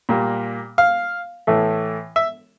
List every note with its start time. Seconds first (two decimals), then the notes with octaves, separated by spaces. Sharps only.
0.09 A#2 G3 A#3
0.78 F5
1.47 A2 E3 A3
2.16 E5